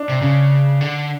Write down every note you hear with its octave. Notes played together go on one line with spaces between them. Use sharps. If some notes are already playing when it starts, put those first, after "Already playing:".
Already playing: D4
C3
C#3
D3